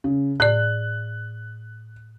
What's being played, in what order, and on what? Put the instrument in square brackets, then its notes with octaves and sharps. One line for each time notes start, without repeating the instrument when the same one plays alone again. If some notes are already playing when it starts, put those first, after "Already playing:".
[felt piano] C#3
[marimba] A2 D5 [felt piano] F#6